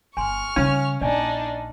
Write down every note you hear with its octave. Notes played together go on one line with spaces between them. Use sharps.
G1 G#5 C6 C#6 F6
C#3 G3 C#4 F5 G#5
A#1 D4 D#4 D5 G#5